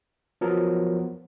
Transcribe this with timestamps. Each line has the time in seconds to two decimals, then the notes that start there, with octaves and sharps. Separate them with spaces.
0.41 F3 F#3 B3 A#4